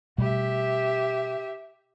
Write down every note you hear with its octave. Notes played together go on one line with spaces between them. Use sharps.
B2 G3 A3 G4 E5